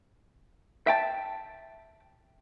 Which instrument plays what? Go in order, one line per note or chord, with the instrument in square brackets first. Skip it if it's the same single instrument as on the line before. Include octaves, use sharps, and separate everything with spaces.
[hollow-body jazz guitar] E5 G5 A5